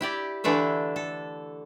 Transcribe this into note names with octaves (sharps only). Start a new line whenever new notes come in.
E4 G4 D5
D3 E3 A3 D4 A4
A4